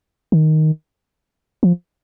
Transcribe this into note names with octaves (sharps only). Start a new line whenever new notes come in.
D#3
F3